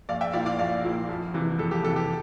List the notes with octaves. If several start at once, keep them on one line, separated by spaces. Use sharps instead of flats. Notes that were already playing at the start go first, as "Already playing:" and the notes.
A#1 D5 F5
E5 G5
A#2 F3 A#3 E4 D5 F5
D5 F5
A#1 D5 F5
A#2 F3 A#3 E4
F2
C3 E3
F2 A4
G4
C3 E3 A4
G4